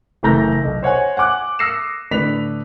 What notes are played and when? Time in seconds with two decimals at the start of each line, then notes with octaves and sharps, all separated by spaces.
0.23 F#1 E3 A3 A#5 G6 A#6
0.63 B1
0.83 C5 C#5 F#5 G#5
1.17 F#5 G#5 D6 F#6
1.59 D#6 E6 A#6 C7 C#7 E7
2.11 A2 D3 D4 B4 B6 F7